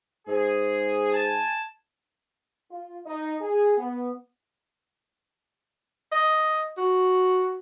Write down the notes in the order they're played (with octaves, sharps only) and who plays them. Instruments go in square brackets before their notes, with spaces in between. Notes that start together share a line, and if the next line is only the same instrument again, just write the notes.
[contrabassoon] G#2 [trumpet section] G#4
[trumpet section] G#5 A5
[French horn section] F4
D#4
G#4
B3
[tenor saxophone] D#5
F#4